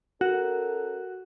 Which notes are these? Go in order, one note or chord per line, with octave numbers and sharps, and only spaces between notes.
C#4 F#4 A4 A#4